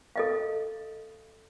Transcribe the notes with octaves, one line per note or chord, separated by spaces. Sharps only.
A4 D#5 F5